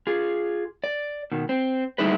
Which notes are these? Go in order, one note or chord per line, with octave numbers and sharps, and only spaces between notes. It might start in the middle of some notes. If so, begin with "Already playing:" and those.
F4 G#4
D5
B2 D#3
C4
G3 A3 D#4 E4 G#4 B4